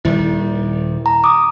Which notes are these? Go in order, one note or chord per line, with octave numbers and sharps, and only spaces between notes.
D#1 D#3 G3 E4
A#5
D6 D#6